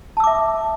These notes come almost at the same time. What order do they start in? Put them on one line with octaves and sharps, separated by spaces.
A5 E6 D6 E5